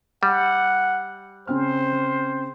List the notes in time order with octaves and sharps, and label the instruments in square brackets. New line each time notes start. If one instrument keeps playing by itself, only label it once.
[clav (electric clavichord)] G3 [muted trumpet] F#5
[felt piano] C#3 C4 F6 [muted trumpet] C5